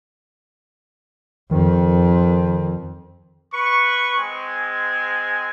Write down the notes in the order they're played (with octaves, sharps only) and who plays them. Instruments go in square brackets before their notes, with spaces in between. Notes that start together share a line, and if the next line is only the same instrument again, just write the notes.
[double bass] F2 [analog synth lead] D#3
[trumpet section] B4 C#6
G#3 C4 G#5